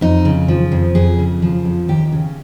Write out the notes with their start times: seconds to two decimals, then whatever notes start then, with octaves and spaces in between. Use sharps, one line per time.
0.01 F2 D#4
0.25 C#3
0.48 F3
0.72 F2
0.95 F2 G#4
1.19 C#3
1.42 F3
1.65 F2
1.88 D#2 G4
2.12 C#3